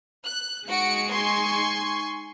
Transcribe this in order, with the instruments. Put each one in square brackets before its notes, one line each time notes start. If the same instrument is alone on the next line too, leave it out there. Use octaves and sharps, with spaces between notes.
[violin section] F#6
[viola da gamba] G#3 D#4 [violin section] F#4 C#7 D7
[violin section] G#5 C6 C#6